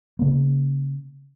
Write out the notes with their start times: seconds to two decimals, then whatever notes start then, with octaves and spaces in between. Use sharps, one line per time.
0.19 C#3 A#3